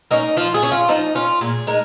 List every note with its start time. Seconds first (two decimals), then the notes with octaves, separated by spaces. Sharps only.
0.11 A#3 C#4 D#4
0.37 F3 F4
0.54 G#4
0.63 C#4
0.72 F4
0.89 F3 D#4
1.15 C#4 F4
1.41 A#2 G#4
1.67 G#3 D#4 A#4